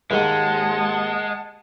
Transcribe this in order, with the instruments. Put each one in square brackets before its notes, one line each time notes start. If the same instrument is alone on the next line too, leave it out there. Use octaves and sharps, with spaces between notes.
[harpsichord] D#2 G#2 [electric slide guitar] G#3 [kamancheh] F#5 A5